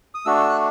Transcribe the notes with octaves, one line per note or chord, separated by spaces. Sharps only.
D#6
A3 D4 F#4 E6
F#6